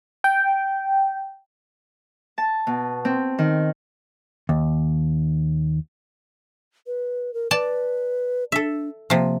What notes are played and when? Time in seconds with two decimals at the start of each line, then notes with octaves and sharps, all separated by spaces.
0.24 G5
2.38 A5
2.67 B2
3.05 C4
3.39 D#3
4.49 D#2
6.87 B4
7.34 A#4
7.51 B4 D5 A5
8.52 D4 A4 E5
9.10 C3 F3 A#3